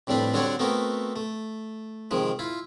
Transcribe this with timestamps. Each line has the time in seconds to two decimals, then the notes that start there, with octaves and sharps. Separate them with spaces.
0.07 F2 A2 G3 C4 D4 B4
0.34 D3 G3 C4 D4 F#4 C#5
0.59 A3 B3 C4 F#4 A#4
1.16 A3
2.11 C3 D#3 F3 G#3
2.39 E4 F4